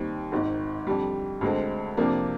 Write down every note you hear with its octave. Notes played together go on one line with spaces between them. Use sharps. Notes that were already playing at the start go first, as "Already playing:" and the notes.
Already playing: D#2 D#3 G3 C4
G#1 G#2 D#3
F2 D3 G3
D2 D3 G#3 C4
F2 C3 F3 A#3 D4